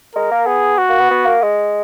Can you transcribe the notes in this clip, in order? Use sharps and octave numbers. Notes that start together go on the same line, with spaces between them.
G#3 A#4
A#3
B3 G#4
F#4
A#3
B3
B3
A#3
G#3